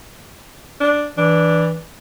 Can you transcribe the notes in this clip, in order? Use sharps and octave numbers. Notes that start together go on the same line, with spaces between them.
D4
E3 D4